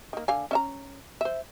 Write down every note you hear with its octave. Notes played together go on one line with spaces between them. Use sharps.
D#3 A#3
D3 F5 G#5
C#4 E5 A#5
C5 E5